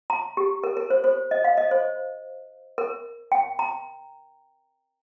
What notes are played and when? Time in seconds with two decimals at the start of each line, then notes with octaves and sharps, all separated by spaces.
0.10 A#5
0.37 G4
0.64 A#4
0.77 A#4
0.90 C5
1.04 C5
1.31 D#5
1.44 F5
1.58 D#5
1.71 C5
2.78 A#4
3.32 G5
3.59 A#5